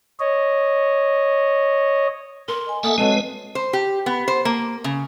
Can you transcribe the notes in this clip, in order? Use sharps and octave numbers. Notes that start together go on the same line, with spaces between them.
C#5 D#5
A#4 C6
D#5 G#5
A#3 A4 E5 F#5 A5 D#6
F#3 G#3 C4 A4 B4 C5 D#5 A5
C5
G4
B3
C5
A#3
C#3